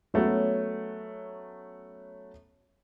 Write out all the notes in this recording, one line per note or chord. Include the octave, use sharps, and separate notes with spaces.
F#3 A3 B3 C#4 F#4